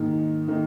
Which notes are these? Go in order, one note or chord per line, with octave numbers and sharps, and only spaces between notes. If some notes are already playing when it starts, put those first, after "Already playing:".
Already playing: G#2 D#3 A#3
D#3 A#3